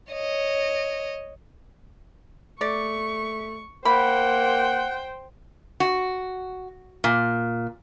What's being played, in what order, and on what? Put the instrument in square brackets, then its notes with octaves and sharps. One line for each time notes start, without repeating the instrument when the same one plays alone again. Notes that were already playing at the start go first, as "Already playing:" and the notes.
[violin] C#5 D#5
[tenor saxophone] A3 [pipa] D5 [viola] C#6
[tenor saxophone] A#3 [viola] C5 G5 [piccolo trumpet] F#5 [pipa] B5
[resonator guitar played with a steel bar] F#4
A#2